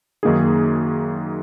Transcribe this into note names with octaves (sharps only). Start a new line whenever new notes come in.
F#2 D#3 A#3 D#4 G#4